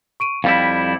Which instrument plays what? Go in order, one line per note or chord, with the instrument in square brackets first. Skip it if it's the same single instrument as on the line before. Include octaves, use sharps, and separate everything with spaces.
[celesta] C#6 D7 D#7
[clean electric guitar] F2 G3 E4 [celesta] F5